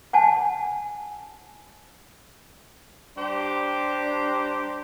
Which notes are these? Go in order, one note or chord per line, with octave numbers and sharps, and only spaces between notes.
F#5 G#5 A5
G3 D4 G4 C5 A#5 C6